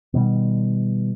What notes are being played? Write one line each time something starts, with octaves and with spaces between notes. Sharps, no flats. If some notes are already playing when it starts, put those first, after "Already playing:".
B2 D#3 G3